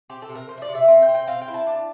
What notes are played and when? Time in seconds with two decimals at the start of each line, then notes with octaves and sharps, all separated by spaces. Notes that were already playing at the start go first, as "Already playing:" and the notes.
0.10 C4 G4
0.22 A4
0.29 C3
0.35 A#4
0.48 F3 C5
0.57 E5
0.62 D5
0.69 C3
0.75 E5
0.88 C4
1.02 G5
1.09 C4
1.15 G5
1.28 C4 F5
1.42 G5
1.48 E4
1.54 A5
1.67 D4